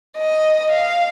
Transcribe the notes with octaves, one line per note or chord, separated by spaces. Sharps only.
D#5
F5